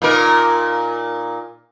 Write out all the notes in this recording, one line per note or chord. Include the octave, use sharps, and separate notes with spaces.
A#2 D#4 A#4